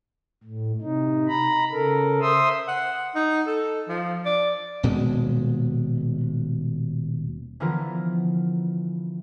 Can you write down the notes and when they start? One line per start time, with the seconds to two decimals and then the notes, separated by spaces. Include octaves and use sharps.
0.44 A2
0.81 C3 D#4
1.28 A#5 B5
1.72 C#3 A4 A#4
2.21 C5 E5 C6 D#6 E6
2.68 F#5
3.15 D#4
3.47 A4
3.88 F3
4.25 D5
4.83 D#1 B2 G#3
7.60 D3 E3 F3 B3 F4 A#4